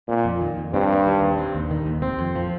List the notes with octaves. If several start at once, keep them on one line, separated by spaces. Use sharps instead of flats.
A#2 C4
F2
D#3
F2
G2 C4
D#2
D#3
D#2
C4
D#2
D#3
D#2
C4
F2
F3